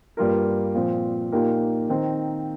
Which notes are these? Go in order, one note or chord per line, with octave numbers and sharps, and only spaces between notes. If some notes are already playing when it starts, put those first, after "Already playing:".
G2 G3 A#3 F4 A#4
A#2 F3 C4
A#2 A#3 D#4 G4 A#4
D#3 C4 D#4